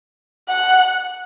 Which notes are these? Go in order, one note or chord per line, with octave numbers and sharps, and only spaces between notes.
F#5